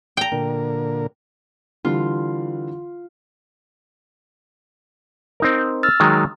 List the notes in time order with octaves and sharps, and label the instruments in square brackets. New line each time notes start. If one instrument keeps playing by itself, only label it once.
[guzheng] G5 A#5
[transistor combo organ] A#2 D3 A#4
[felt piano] D3 E3 G3 [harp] F4
[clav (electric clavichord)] C4 D#4 A#4
[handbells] E6 F6 A6
[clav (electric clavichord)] D#3 F#3 G#3